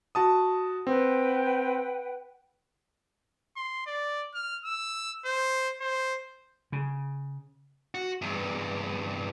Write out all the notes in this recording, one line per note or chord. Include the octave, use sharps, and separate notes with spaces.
F#4 A5 D#6
C4 B4 F#5 G5
C6
D5
F6
E6
C5
C5
C#3
F#4
E2 G2